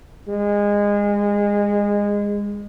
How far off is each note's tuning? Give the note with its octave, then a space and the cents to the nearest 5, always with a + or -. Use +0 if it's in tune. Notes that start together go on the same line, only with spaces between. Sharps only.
G#3 -25